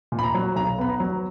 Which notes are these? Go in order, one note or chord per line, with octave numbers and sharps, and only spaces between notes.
A#2
B5
A#5
F#3
B1 A#5
B3 B5
A#5
F#3